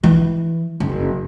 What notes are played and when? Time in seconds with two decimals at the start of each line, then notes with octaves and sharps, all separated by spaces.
0.03 E3
0.80 F#1